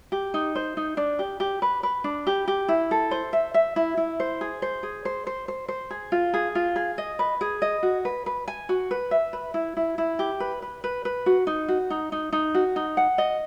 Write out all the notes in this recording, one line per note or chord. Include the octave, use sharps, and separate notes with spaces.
G4
D#4
C5
D#4
D4
G4
G4
B4
B4
D4
G4
G4
E4
A4
C5
E5
E5
E4
E4
C5
G#4
C5
G#4
C5
C5
C5
C5
G#4
F4
G#4
F4
G#4
D#5
B4
G#4
D#5
F#4
B4
B4
G#5
F#4
B4
E5
B4
E4
E4
E4
G4
B4
B4
B4
B4
F#4
D#4
F#4
D#4
D#4
D#4
F#4
D#4
F#5
D#5